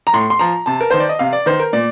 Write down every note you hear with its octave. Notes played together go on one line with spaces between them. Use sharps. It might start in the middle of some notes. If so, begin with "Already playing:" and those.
A#5
A2 C6
C6
F3 A#5
C3 A5
A#4
D#3 C5
D5
D#5
C3 F5
D5
D#3 C5
A#4
A#2 D5